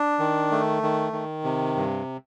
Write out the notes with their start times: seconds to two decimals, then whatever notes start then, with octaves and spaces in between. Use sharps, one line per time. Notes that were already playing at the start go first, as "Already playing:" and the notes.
Already playing: D4
0.19 D#3
0.51 A3
0.83 D#3
1.13 D#3
1.44 C3
1.76 G2